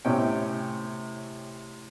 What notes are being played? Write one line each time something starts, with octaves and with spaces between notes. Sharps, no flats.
A2 C3 C#4 G5